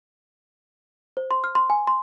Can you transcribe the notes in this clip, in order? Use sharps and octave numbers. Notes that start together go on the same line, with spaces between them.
C5
C6
F6
C6
G#5
C6